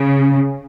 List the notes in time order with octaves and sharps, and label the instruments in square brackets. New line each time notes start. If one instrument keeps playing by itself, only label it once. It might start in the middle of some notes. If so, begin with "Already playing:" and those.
Already playing: [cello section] C#3